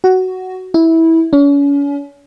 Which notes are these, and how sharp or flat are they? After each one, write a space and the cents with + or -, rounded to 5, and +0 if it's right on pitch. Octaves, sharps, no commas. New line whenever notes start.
F#4 +10
E4 -15
C#4 +40